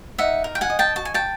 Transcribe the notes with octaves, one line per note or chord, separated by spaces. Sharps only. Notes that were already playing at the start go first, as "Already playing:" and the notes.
D#4 E5 F#5
A#4
G5
F#5 G#5
D#5
G5 A5
F#4 A5
G#5
G5 A5